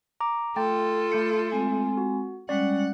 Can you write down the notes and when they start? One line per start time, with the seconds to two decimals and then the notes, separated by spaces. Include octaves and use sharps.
0.20 A#5 D6
0.56 A3 F4 A4 G5 C6 A6
1.12 A3 G6 C#7
1.51 G#3 C4 G#5
1.97 F#4
2.49 G3 G#3 C#4 D5 F#5